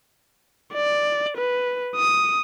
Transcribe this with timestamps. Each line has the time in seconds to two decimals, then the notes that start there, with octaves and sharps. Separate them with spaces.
0.74 D5
1.37 B4
1.96 D#6